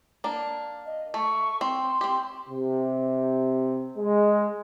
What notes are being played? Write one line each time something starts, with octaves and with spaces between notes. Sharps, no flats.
A#3 D4
D#5
A3 C#6
C4 C6
C4 G4
C3
G#3